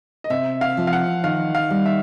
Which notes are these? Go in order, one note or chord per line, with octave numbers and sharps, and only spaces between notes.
D#5
C3 E5
F5
F3
F5
F#5
D#3 F5
F5
G3
E5